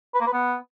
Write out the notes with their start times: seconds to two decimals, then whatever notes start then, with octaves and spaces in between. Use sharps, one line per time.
0.14 B4
0.21 A#3
0.27 B4
0.33 B3